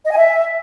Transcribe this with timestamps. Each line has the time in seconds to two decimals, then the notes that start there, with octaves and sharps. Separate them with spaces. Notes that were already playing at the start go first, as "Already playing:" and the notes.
0.04 D#5
0.11 G#5
0.17 E5